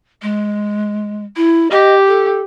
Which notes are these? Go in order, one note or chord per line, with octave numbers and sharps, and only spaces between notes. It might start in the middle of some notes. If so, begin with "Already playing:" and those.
G#3
E4
G4 D#5
A4